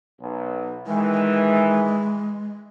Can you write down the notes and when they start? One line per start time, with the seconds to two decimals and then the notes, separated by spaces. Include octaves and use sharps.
0.20 B1
0.87 D#3 E3 G#3